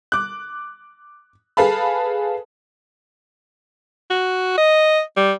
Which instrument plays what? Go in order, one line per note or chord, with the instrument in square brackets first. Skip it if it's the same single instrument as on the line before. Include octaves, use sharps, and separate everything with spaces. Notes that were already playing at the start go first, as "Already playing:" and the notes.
[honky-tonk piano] D6 F#6
G#4 A4 B4 F5 A5 B5
[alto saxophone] F#4
D#5
G3